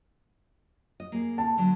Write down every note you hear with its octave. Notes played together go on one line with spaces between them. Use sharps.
D#5
A#3 G#4
A5
D3 F#3 D5